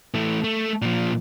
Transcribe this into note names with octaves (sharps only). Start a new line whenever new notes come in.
E3 A3
A3
A#2 F3